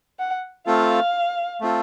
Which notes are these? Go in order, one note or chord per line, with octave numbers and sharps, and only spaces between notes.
F#5
A3 C4 F4 A4 F5
A3 C4 F4 A4